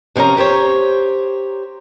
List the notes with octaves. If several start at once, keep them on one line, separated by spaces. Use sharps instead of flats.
C3 F3 C#4 A#4 A#5
G4 A#4 C5 C#5